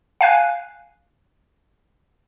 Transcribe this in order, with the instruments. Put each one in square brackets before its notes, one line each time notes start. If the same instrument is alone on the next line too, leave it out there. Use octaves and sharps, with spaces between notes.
[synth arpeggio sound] F5 G#5 F#6